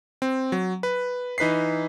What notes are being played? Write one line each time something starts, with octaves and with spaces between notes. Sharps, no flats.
C4
F#3
B4
E3 D#4 B4 B6 C7